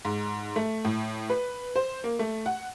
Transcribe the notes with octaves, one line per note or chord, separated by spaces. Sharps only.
G#2
A3
A2
B4
C5
A#3
A3
F#5